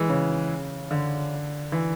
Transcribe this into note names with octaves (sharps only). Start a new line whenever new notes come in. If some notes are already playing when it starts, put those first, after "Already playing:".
Already playing: E3 G#3
C#3
D3
E3